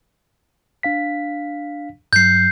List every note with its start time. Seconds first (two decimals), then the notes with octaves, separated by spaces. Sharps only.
0.83 D4 F5 B6
2.13 G2 F#3 G6 C7